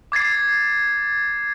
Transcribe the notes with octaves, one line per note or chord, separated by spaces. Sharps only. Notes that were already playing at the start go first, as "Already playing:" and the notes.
D6 G#6 A6 C7